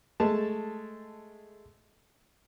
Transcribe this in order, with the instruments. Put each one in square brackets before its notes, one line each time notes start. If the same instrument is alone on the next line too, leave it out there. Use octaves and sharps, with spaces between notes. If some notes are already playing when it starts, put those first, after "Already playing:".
[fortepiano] G#3 A3 A5